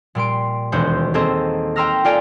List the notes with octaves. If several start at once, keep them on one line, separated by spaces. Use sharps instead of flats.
A#2 G3 C6 D7
E1 D#2 G#3 F#4 C5 G6
A#3 C4 G#4 A4 C5 D#5
G5 A#5 C6 E6 F6 A#6
F4 A4 D5 F5 G5 G#5